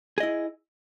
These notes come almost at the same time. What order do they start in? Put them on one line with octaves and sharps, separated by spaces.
G#4 D#5 E4